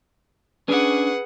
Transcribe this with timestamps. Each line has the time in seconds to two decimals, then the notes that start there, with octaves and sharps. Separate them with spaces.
0.68 C#4 D4 G#4 B4 F#5 G#5